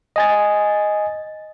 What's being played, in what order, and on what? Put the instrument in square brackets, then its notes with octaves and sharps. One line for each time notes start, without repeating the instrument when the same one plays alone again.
[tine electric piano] D#5 G#5 A6